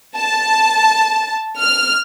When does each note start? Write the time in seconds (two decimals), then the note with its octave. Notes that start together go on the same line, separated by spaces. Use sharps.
0.18 A5
1.58 F6